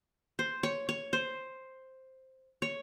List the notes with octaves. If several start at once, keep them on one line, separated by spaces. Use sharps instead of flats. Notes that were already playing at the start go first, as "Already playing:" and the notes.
C5
C#5
C#5
C5
C#5